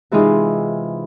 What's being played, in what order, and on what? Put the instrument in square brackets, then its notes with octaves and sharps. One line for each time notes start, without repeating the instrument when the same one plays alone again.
[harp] C3 E3 G#3 D#4 F4 G#4